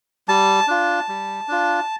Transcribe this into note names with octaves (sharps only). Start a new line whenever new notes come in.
G3 A5
D4 F4
G3
D4 F4